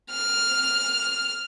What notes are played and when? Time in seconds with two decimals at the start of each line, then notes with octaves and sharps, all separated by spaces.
0.11 F6